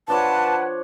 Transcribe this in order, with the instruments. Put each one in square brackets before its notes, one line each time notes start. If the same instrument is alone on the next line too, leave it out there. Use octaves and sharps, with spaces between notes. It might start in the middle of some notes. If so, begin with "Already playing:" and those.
[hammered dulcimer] F3 D4 C#5 [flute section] B4 F#5 [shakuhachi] A5